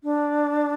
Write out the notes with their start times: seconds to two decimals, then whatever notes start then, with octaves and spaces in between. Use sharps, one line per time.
0.03 D4